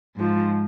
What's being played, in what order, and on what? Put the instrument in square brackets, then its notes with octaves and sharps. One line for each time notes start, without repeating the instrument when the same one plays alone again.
[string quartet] G#2 F3